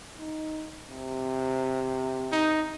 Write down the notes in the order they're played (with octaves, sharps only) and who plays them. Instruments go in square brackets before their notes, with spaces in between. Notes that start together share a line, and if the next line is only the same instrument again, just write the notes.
[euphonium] D#4
C3
[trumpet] D#4